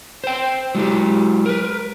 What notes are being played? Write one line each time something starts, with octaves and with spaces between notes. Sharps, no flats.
C5 G5
F#3 G#3 C#4 E4 G4
A#4 B4